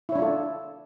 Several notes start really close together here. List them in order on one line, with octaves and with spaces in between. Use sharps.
E4 C#5 D4 F4 A4